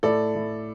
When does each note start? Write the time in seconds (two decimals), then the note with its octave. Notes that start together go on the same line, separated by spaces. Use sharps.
0.03 A2 A4 D5
0.35 A2